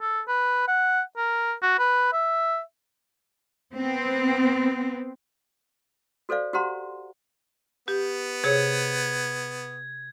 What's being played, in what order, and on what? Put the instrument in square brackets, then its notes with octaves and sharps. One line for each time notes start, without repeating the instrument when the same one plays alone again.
[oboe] A4
B4
F#5
A#4
F#4
B4
E5
[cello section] B3 C4
[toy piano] F#4 A4 C5 D5 F5
F#4 G4 C5 F#5 A#5 C6
[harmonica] B3 [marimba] G4
[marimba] C3 G#4 C#5 [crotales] G#6